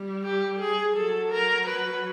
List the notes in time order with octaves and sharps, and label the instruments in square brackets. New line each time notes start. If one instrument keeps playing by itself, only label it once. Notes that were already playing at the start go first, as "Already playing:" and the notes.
Already playing: [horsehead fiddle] G3
[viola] G4
G#4
[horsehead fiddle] F#3 [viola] A4
[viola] A#4
B4